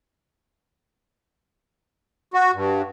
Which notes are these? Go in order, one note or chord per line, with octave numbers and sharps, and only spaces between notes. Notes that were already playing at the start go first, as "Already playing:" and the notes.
F#4
G2